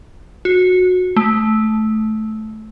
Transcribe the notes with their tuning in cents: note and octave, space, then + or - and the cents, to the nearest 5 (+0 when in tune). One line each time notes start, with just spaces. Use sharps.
F#4 -20
A3 -15